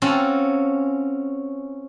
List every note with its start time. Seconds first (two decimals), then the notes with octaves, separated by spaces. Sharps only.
0.02 C4 C#4 F4 F#4 A4